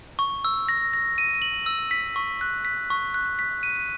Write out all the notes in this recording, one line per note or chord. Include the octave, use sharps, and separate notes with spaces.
C#6
E6
A#6
A#6
D#7
F#7
E6
B6
C#6
F#6
B6
C#6
F#6
B6
D#7